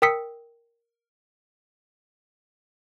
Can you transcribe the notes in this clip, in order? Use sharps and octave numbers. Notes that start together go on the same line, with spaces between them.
A#4 G5 D#6 E6 B6 C#7